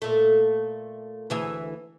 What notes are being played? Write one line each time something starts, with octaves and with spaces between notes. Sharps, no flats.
A#2 A3
D2 E3 G#4